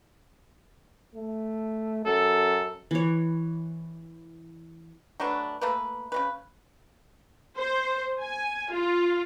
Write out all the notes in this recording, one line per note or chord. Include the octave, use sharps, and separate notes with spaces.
A3
F#2 A4
E3 C#5
F#3 A3 D4 B4
A3 A#3 B4
C#3 G#3 B4
C5
G#5
F4